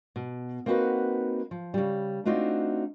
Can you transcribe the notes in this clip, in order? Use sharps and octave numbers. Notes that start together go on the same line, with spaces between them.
B2
A#3 C4 D#4 F#4 B4 F#5
F3
C#3 G3
A3 C4 D4 D#4 F4 F#4